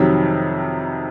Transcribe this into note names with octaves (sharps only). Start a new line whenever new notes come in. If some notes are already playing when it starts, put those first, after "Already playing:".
Already playing: F2 C3 D#3 F#3